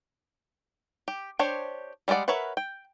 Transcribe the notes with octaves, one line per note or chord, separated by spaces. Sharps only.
G4
D4 G4 C5 C#5
G3 G#3 F4 D5 F#5
A#4 B4 C#5 E5 F#5
G5